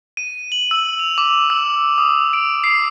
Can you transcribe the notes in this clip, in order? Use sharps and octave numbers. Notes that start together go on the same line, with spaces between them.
D#7
F#7
E6
F7
D6
E6
D#6
D7
C7